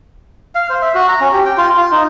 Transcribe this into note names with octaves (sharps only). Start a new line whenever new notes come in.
F5
C5
E5
F#4
A#5
C#4
G4
G5
F4
F4
D#4